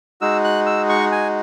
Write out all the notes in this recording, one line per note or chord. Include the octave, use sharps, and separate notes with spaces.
G#3 D#4 F#4 E6
F#6
E6
C#6
G#5